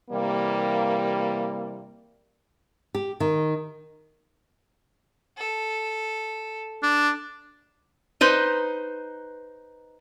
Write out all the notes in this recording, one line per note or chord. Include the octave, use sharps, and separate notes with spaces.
C3 E3 G3 A#3
G4
D#3
A4
D4
D#4 B4 C5